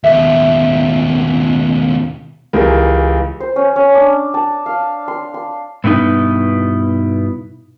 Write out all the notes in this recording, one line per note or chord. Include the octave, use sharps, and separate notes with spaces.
D#2 B2 E5
C#2 E3 G4 G#4 A#4
C5
C#4
C#4
D4
A5
F5
C6
C6
G2 B2 A3 D#4 E4